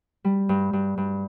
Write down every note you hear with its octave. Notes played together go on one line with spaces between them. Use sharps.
G3
G2
G2
G2